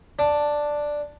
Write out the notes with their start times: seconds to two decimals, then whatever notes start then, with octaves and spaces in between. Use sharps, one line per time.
0.19 D4